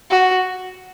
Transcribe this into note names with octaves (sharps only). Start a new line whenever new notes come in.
F#4